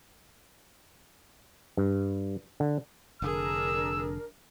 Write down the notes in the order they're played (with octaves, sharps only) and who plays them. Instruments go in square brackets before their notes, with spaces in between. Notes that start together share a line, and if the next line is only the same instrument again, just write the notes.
[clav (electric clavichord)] G2
D3
[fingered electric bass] F1 D3 [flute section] D4 A#4 [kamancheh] G#4 [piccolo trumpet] E6